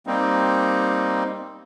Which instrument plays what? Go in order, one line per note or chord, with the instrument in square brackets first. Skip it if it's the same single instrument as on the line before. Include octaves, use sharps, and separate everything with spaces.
[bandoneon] G3 A#3 C4 D#4